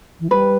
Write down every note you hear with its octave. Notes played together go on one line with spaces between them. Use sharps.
E3
G3 B4